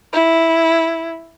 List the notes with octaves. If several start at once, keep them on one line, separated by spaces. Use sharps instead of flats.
E4